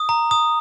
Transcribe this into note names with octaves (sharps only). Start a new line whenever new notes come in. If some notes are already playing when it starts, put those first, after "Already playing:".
Already playing: D#6
A#5
D#6